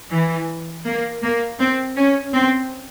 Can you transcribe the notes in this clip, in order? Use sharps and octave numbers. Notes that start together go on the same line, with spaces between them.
E3
A#3
A#3
C4
C#4
C4